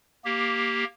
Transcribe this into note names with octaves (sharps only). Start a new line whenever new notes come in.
A#3 G4